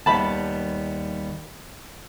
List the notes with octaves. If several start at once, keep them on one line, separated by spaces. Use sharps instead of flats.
D#2 G3 B3 A5 B5